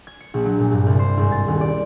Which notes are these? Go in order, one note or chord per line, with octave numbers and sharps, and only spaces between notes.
G#6
C#7
A#1
F#3
A#2
G2
C2
C5
G#1
A6
D#1
D5